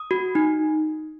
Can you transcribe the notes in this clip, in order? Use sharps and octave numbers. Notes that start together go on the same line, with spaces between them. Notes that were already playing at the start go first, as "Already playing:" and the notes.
Already playing: D#6
F#4
D#4